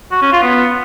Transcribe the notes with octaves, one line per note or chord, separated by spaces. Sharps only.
F#4
C#4
F4
B3